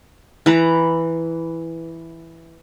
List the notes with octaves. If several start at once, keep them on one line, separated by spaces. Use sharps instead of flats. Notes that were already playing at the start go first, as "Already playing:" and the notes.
E3 B4 A#5